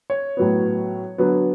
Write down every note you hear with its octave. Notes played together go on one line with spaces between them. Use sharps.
C#5
A2 F#3 B3
D3 F#3 B3